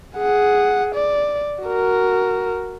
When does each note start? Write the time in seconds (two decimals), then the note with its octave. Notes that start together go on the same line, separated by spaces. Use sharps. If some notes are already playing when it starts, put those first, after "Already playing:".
0.17 G#4 F#5
0.95 D5
1.63 F#4 A#4